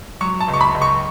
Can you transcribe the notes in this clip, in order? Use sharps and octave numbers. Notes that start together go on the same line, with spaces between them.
F#3 C#6
A5
C#2
C#6
B5
C#2
C#6